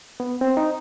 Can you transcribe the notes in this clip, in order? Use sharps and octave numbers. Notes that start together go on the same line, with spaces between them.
B3
C4
D#4